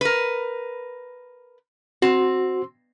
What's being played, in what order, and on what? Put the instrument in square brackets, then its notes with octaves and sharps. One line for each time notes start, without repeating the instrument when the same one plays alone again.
[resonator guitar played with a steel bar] A#4 B4
[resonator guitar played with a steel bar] C4 [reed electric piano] F#4